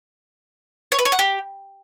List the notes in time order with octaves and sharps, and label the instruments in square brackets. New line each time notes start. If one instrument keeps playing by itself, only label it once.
[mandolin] C#5
B4
C#5
F#5
G4